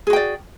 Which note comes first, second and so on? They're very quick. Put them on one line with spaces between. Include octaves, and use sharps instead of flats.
G#4 F#4 G5 D5